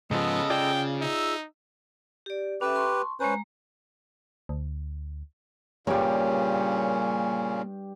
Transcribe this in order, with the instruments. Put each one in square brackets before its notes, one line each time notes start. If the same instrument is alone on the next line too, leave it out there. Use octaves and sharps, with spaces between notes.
[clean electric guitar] G#2 F3 [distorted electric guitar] C#3 [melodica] G#3 A4 D#5 [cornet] B3
[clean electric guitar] F4 G#4 D5 [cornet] G5
[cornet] D#4 [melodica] E5 E6
[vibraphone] G4 D5
[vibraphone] C#4 A4 E5 [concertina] G4 B4
[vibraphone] A5 C6 C#6
[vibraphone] G#3 A#5 [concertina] C#4 B4 C5
[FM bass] D2
[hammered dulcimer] G2 G4 [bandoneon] A#2 C#3 C#4 [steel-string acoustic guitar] A#3 C#5 D5